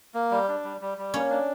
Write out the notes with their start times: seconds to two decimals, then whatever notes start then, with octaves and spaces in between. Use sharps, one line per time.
0.14 A#3
0.31 G3
0.48 D4
0.64 G3
0.81 G3
0.98 G3
1.14 A#3 C#4
1.30 D4